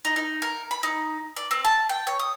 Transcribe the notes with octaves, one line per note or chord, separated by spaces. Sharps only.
D#4
D#4
A#4
B5
D#4
D5
C4
A5
G5
C#5
D#6